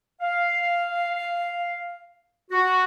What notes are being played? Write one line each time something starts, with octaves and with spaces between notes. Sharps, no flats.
F5
F#4